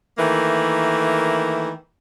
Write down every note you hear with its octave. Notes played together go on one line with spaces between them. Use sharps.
D#3 E3 A3 A#3